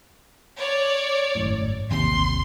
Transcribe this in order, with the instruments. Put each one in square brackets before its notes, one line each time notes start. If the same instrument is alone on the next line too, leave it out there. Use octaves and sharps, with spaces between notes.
[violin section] C#5 D5
[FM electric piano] G#1 F#2 A2
[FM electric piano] A1 D#2 C3 [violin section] C6